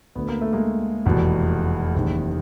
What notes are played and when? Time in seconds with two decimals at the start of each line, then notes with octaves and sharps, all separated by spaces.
0.15 D2 D3 B3
0.28 A#3
0.41 A3
0.53 G#3 A#3
1.06 F1 E2 B2
1.95 F#1 E2 C3 D#3